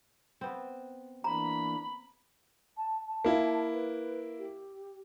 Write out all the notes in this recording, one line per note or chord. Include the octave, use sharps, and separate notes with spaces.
B3 C4
E3 A#3 D4 A#5 B5
A5
A5
A#3 E4
B4
G4